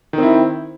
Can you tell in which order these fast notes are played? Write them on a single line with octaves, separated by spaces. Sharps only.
D#3 C4 E4